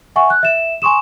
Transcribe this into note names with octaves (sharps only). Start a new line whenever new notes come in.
E5 F#5 G#5 C#6
F#6
E5 E7
G#5 C6 C#6 D#6 E7